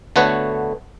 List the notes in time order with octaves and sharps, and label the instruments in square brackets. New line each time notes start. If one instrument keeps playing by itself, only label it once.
[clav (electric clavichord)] D3 A3 B3 F#4 B4 C#5